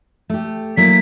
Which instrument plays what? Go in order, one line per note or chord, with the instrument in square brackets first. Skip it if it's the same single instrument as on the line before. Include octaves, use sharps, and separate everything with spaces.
[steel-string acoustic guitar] A3 G4
[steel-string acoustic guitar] F#3 A#3 E4 [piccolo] B6